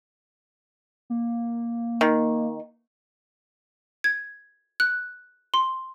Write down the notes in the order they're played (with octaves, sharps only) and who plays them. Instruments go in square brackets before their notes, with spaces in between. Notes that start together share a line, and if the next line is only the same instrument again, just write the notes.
[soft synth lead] A#3
[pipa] D#3
[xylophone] G#6
F#6
C6